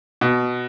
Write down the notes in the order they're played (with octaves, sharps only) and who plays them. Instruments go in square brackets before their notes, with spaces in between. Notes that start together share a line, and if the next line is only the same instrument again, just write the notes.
[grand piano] B2